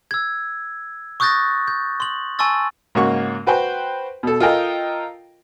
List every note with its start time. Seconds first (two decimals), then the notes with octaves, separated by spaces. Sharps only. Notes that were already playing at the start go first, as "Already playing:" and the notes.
0.11 E6 G#6
1.20 C#6 D#6 F#6 G6 A6 A#6
1.68 G6
2.00 C6 F#7
2.39 G#5 A5 C6 C#6 E6 A6
2.95 G#2 C#3 A#3 F#4 C#6
3.47 F#4 B4 C5 G5
4.23 B2 A4
4.40 F4 A4 A#4 D#5 G5 A#5